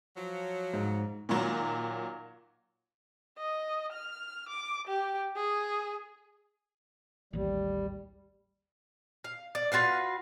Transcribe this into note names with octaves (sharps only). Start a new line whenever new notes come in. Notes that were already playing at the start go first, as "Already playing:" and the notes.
F3 F#3
G#2
A#2 D#3 F#3
D#5
F6
D6
G4
G#4
A1 D#2 G3
F5
D5
F4 F#4 B4 F5